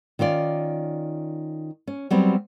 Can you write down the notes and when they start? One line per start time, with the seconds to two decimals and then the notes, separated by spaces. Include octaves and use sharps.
0.19 D#3 C#4 F4 D5
1.87 C#4
2.10 F#3 G3 B3 C4